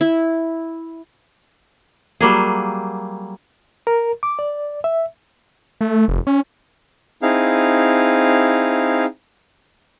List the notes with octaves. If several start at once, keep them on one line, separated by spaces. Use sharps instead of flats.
E4
F#3 G3 A#3 G#4
A#4
D6
D5
E5
A3
F1
C#4
C4 D#4 E4 G#4 F5